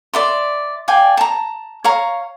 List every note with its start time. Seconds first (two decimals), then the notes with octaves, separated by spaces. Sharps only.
0.14 D5 E5 C6
0.88 D5 F5 G5 G#5
1.17 A5 A#5
1.84 C#5 F5 A#5